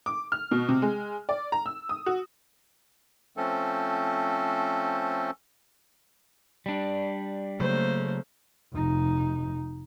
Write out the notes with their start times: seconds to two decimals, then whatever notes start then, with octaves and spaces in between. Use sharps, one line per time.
0.06 D6
0.32 F6
0.51 B2
0.69 C3
0.82 G#3
1.29 D5
1.52 A#5
1.66 E6
1.89 D#6
2.06 F#4
3.37 F3 A3 C4 C#4 A4
6.66 G3 D4
7.60 C#3 F#3 A3 A#3 C5
8.73 F1 D#4